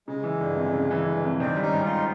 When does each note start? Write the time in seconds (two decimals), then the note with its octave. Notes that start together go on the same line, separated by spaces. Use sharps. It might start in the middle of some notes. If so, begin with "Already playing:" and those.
0.07 C#3 G#3
0.23 E3
0.40 G1
0.57 F2
0.73 C#3
0.91 E3
1.07 G1
1.24 F2
1.40 D#3 C4 D4
1.57 G3
1.62 C#4 D#4
1.73 G#1
1.84 D#4 F4